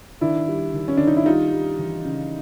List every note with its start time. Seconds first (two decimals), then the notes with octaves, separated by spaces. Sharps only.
0.21 D#3 D4 E4
0.48 G3
0.74 D#3
0.88 C#4
0.97 D#3 D4
1.07 D#4
1.16 E4
1.26 G3 D#4 F4
1.52 G3
1.79 E3
2.05 C#3